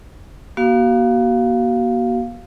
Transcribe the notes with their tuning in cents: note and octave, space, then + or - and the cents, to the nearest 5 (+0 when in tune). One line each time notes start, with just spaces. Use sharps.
A#3 +45 F#4 +25 F5 +0